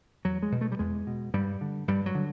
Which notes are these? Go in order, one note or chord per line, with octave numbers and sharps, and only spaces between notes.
E2 F#3
G#3
B2
A3
G3
E2 G#3
B2
G2 G3
D3
G2 G3
F#3
D3